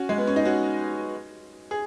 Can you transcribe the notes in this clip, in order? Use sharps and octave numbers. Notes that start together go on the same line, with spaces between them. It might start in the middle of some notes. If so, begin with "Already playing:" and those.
Already playing: C#4 F#4
G#3
B3
C#4
D#4
C#4 F#4
G#4